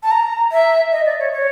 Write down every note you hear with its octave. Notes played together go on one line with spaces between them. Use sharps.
A5
A#5
E5
D#5
D5
C#5
C#5